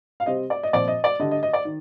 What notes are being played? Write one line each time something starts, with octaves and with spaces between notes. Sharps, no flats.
F5
C3 G3 C4 D#5
D5
D#5
A#2 F3 C4 D5
D#5
D5
D3 G3 D4 D#5
D#5
D#5
D5
D#3